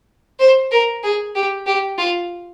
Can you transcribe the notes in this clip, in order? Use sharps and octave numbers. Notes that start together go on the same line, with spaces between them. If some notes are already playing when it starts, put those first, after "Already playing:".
C5
A#4
G#4
G4
G4
F4